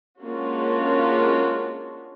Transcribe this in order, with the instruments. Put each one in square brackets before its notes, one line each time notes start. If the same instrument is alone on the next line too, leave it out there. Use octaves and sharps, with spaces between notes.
[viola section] G#3 A#3 C#4 D4 F4 F#4